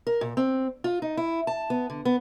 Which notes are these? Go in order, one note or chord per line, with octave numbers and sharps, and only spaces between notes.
A#4
A#2
C4
F4
D#4
E4
A5
B3
D3
B3